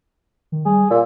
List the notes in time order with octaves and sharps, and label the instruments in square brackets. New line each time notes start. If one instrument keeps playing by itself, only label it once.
[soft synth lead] D#3
[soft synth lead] G3 [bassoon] G#4
[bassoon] A#2 [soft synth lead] E6